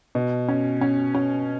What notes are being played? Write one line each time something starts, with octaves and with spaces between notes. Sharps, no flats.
B2
C#4
C#4
C#4